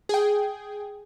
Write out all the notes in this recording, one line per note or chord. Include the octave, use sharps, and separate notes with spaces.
G#4 G5